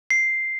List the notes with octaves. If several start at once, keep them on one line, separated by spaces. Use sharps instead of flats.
C7